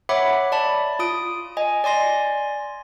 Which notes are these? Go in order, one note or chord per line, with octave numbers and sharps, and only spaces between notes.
C#5 E5 F#5 B5 D6
D5 A5 B5
F4 D#6 D7
D#5 G#5
D5 G#5 C6 A#6